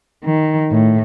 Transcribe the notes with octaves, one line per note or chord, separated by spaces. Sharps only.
D#3
A2